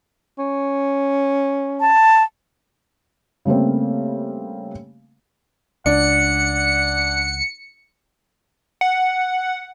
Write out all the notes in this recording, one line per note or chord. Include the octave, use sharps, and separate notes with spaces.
C#4
A5
C#3 G3 A3 A#3 C4
C#2 D4 F#5 C#7
F#5